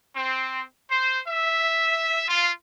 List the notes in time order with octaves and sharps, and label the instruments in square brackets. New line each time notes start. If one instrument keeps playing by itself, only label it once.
[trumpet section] C4
C5
E5
F4